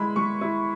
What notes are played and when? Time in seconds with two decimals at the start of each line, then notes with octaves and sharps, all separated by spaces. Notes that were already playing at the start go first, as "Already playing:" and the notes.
Already playing: G#3 E4 B5
0.16 G#3 C#6
0.41 E4